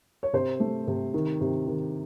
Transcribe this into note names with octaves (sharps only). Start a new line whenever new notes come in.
C#5
C3 C5
A3
C3
D#3
C3
D#3